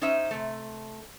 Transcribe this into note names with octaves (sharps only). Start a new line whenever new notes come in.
C#4 D#4 C5 D#5 E5
C3 A3